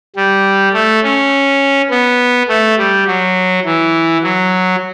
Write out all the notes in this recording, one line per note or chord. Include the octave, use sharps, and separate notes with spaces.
G3
A3
C#4
B3
A3
G3
F#3
E3
F#3